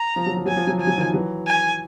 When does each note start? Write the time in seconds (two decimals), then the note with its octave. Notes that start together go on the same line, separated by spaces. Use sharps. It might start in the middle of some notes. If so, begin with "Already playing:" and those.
Already playing: A#5
0.16 F3
0.26 F#3
0.37 F3
0.46 F#3 G#5
0.56 F3
0.67 F#3
0.78 F3 G#5
0.87 F#3
0.98 D#3 F3
1.13 E3 F#3
1.47 G#5